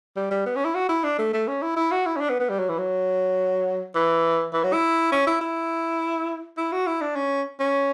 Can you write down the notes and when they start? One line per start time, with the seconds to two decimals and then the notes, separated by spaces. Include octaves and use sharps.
0.16 G3
0.31 G3
0.46 B3
0.56 C#4
0.65 E4
0.74 F#4
0.89 E4
1.04 D4
1.19 A3
1.33 A3
1.48 C#4
1.62 E4
1.76 E4
1.91 F#4
2.06 E4
2.16 C#4
2.20 D4
2.29 B3
2.40 B3
2.49 G3
2.59 F#3
2.69 E3
2.78 F#3
3.95 E3
4.53 E3
4.63 F#3
4.73 E4
5.12 C#4
5.27 E4
5.41 E4
6.57 E4
6.72 F#4
6.87 E4
7.01 D4
7.16 C#4
7.59 C#4